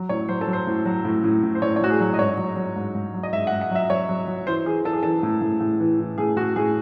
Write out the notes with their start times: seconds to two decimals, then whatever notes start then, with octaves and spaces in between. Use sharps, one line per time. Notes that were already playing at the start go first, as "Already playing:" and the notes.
Already playing: F#3
0.09 A2 C#5
0.29 F#3 C5
0.41 A4
0.47 F#3
0.53 C5
0.67 A2
0.85 F#3
1.05 A2
1.24 A2
1.43 A2
1.55 C5
1.62 A2 C#5
1.76 C#5
1.81 A2 F#4
1.90 G#4
2.00 F#3
2.14 D#5
2.19 G#2 C#5
2.38 F#3
2.56 F#3
2.76 G#2
2.95 G#2
3.14 F#3
3.23 D#5
3.33 G#2 E5
3.47 F#5
3.52 G#2
3.61 F#5
3.71 F#3 E5
3.90 F#3 C#5
4.09 F#3
4.28 F#3
4.47 E3 C5
4.66 E3 G#4
4.85 E3 A4
4.93 G#4
5.03 E3 A4
5.23 A2
5.41 A2
5.60 A2
5.80 E3
5.99 E3
6.18 A2 G#4
6.36 A2 F#4
6.56 A2 G#4